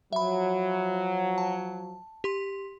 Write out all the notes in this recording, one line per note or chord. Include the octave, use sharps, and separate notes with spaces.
F3 F#3 E5 B5
A5
G4 C6